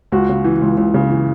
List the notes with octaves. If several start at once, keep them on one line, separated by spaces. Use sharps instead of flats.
C#2 F#4
C#3
E3
C#2
C#2
C#3
E3